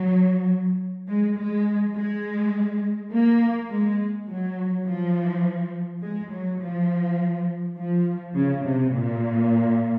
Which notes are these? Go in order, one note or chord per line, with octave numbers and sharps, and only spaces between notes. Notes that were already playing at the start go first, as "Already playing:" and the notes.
Already playing: F#3
G#3
G#3
G#3
A#3
G#3
F#3
F3
G#3
F#3
F3
F3
C#3
C3
A#2